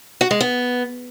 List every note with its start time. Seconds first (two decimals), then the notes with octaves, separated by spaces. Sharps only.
0.21 F#4
0.31 G#3
0.40 B3